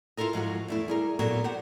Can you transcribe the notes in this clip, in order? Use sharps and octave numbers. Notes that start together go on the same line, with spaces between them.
E4 F4 A4 A#4 D#5
G#2 F3 F#3 F#4
E2 A3 E4
G3 G#4 A#4
A#2 F#3 B3 F#4 A4 A#4
G4 C5 F#5